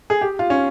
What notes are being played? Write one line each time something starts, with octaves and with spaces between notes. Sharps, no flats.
G#4
G4
F4
C#4